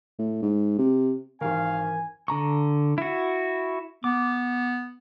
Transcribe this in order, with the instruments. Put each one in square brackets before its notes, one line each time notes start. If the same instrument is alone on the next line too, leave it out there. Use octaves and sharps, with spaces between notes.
[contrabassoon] A2
G#2
C3
[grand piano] G#1 D#3 [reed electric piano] E3 A#4 [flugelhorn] F5 [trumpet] G#5
[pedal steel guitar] D3 A#5 C#6
E4 F#4
[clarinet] B3 [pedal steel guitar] D6